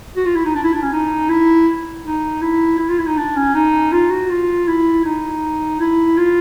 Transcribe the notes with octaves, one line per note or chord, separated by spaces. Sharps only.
F#4
F4
E4
D#4
D4
E4
D4
C#4
D#4
E4
D#4
E4
E4
F4
E4
D#4
D4
C#4
D#4
F4
F#4
F4
E4
D#4
E4
F4